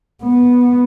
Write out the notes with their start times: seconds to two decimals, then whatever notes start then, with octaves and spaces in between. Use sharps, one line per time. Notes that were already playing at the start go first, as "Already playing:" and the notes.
0.23 B3